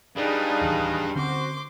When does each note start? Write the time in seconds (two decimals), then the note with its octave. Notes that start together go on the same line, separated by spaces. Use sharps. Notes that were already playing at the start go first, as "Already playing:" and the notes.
0.16 G3 D4 D#4 G#4 B4 D5 F5
0.61 D1 D#2 E3
1.15 D3 C4 C#4 F#4 C5 C6 D6